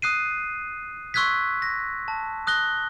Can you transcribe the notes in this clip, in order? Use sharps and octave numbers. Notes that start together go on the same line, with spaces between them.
D#6 F#6 C7 D#7
C6 C#6 E6 F#6 G#6 B6
A#6
A5
D#6 F#6 A#6 G7